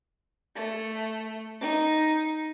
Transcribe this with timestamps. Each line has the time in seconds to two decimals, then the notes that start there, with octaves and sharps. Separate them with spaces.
0.55 A3
1.60 D#4